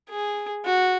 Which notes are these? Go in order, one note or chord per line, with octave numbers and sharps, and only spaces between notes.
G#4
F#4